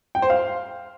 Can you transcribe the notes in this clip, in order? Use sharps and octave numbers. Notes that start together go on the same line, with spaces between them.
G5
C5
F5